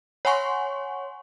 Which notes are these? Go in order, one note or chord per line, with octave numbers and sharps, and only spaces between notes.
C#5 F#5 G#5 C6 C#6